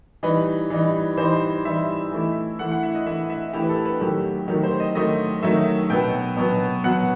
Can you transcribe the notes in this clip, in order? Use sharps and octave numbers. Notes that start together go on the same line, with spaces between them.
E3 G3 D#4 B4
E3 G3 D#4
E3 G3 D#4 C5
E3 G3 D#4 E5
E3 A3 E4
E3 A3 E4 F#5
F#5
E5
D#5
E3 A3 E4 E5
E5
E3 A3 E4 G4
B4
A4
B4
D#3 F#3 A3 G4
D#3 F#3 A3 G4
C5
D#5
D#3 F#3 A3 D#5
D#3 F#3 A3 E5
B2 F#3 B3 G5
B2 F#3 B3
B2 F#3 B3 F#5